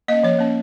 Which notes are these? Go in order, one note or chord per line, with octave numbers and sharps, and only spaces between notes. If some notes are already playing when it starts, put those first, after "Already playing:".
A#3 C#4 D#5
F3 C#5
A#3 C#4